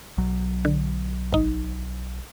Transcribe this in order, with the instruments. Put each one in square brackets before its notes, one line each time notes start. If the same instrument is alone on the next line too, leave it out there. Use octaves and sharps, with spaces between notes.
[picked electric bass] B1 F#3
[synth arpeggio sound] D3
G#1 D#4